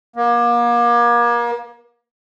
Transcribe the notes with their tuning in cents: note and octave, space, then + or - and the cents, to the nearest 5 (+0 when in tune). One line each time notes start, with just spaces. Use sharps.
A#3 +35